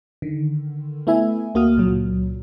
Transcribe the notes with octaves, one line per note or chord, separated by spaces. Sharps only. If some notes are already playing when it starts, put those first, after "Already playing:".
D3 D#3
A3 B3 E4 E5 G#5
D2 A#3 F#4 D#6 F6
C#2 A#2 F#3